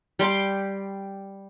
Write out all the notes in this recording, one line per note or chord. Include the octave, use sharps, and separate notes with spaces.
G3 G4 C6 D6